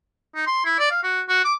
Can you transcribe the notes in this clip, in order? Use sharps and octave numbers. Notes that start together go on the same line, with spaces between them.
D#4
C6
E4
D5
F5
F#4
F#4
D6